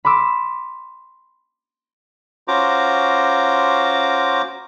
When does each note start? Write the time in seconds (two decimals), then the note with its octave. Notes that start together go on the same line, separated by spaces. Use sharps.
0.05 B5 C6 D6 E6
2.48 C#4 F4 F#4 C5 A#5 D6